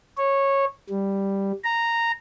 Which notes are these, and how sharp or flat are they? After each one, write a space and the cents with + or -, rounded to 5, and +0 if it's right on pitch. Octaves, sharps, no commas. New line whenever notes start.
C#5 -15
G3 +0
A#5 -10